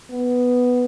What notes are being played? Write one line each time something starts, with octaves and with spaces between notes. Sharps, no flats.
B3